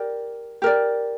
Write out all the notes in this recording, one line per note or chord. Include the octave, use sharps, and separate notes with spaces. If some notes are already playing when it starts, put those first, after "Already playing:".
Already playing: G4 A#4 D5
G4 A#4 D5